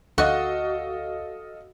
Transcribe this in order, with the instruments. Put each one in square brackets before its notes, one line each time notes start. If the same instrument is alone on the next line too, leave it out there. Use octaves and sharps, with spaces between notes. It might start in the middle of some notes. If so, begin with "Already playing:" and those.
[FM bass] D2 [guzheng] F#4 [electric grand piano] A4 D#5 F5